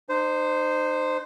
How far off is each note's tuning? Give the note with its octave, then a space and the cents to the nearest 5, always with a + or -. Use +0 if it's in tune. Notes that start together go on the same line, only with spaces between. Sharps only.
D#4 -40 C5 -10